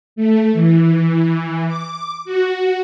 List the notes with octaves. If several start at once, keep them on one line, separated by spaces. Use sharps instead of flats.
A3
E3
D6
F#4